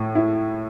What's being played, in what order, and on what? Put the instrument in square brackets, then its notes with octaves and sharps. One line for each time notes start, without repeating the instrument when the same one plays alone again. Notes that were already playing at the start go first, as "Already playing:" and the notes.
Already playing: [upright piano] A2
E4